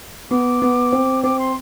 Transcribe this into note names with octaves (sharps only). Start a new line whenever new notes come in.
B3 D6
B3
C4
C4 D6
C6